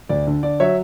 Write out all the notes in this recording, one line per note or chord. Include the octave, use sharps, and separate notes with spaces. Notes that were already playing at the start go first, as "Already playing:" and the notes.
D2 D5
D3
D3 D5
F#3 C#5 E5